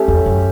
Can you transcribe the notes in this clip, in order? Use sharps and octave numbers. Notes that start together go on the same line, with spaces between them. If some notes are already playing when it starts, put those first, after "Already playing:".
Already playing: A3 C#4 G4
E2
F#2